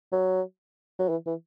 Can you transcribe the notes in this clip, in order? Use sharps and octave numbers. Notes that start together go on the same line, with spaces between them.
F#3
F#3
E3
E3